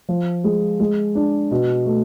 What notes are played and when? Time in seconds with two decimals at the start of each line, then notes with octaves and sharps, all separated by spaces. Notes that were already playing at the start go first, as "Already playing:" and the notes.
0.09 F3
0.44 G#3
0.80 G#3
1.15 D4
1.51 B2
1.86 A3